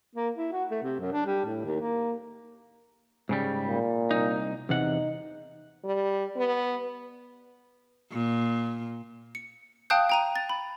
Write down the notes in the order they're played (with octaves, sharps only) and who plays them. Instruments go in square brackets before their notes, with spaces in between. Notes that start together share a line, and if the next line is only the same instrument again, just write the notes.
[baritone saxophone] A#3
E4
F#4
A3
C3
F#2
D4
G3
A2
D#2
A#3
[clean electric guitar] G#2 C#3 G3
[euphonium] A#2
[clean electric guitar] C2 D#4
[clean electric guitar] E2 C3 F#5 [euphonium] D#4
[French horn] G3
B3
[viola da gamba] A#2
[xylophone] C#7
F5 G5 A5 D#6 F#6 G6
G5 A#5 D#7
A6
B5